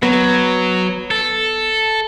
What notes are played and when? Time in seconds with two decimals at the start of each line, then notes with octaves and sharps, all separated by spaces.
0.03 F#3 B3
1.11 A4